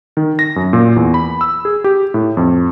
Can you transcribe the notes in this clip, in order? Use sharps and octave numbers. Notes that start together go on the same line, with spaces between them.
D#3
A#6
F#2
A#2
E2
B5
E6
G#4
G4
A2
F2